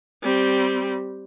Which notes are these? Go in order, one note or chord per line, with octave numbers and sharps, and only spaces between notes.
G3 C4